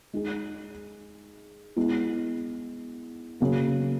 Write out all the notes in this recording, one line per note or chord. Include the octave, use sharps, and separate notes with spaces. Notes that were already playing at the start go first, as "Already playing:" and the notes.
G#3 D#4 G#4
G#3 B3 E4
C#3 F#3 A#3